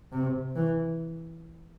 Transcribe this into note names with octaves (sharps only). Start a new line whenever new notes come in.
C3
E3